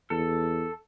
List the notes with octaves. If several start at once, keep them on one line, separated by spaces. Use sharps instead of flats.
E2 A4